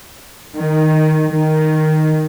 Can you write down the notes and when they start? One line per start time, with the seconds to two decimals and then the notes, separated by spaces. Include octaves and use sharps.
0.56 D#3
1.33 D#3